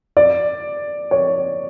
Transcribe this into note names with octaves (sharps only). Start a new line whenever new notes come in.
D5
C#5